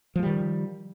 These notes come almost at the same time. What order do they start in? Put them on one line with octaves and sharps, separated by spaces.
F3 G#3 G3 D#3